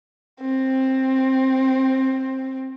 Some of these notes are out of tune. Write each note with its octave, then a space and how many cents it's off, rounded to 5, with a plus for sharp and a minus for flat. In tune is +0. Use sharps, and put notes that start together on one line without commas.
C4 +15